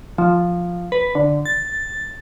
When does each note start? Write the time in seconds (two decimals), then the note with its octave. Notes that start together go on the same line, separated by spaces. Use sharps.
0.18 F3
0.92 B4
1.15 D3
1.46 A6